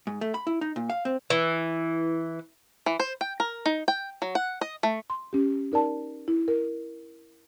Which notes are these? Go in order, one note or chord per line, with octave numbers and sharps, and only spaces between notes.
G#2
A3
B5
E4
D#4
A#2
F5
C4
E3
E3
C5
G5
A#4
D#4
G5
F#3
F#5
D#5
A3
C6
C#4 G4
D#4 A#4 D5 A5
E4
A#4